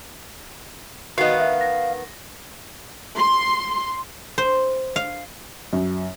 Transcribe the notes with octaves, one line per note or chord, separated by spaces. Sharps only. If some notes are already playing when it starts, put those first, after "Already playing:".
D#3 B3 F#4 D#5 F5
E5
A#6
C6
C5
F5
F#2